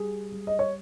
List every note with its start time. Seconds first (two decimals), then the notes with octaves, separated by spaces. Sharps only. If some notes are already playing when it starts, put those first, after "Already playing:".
Already playing: G3 G#4
0.32 G3
0.47 D#5
0.59 C#5